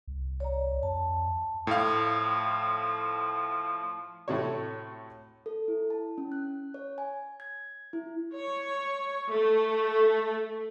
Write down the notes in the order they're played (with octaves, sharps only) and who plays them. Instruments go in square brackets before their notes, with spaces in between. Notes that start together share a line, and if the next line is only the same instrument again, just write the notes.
[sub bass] C2
[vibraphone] C#5 D5 A#5
[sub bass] F2 [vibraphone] A5
[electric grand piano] A2 F5 [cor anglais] F3
[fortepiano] A2 C3 A3 F#4 C#5
[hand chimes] A4
E4
A5
C#4
F#6
C#5
G#5
G#6
E4
[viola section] C#5
A3